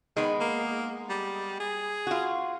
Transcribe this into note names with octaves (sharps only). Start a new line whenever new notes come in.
D#3 G#3 B3
A#3
G3
G#4
F4 F#4